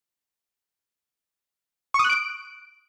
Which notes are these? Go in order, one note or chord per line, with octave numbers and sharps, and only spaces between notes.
C#6
D#6
F#6
D7